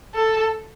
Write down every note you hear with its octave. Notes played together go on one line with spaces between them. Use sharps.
A4